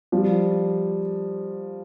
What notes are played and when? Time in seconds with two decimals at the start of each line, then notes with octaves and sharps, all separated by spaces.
0.12 F3 G3